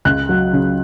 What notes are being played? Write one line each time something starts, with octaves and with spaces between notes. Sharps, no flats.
C#2 F#6
F#3
C#3